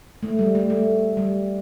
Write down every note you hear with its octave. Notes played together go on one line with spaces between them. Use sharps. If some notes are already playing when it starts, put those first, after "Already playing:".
A3
G3
A3
A3
G3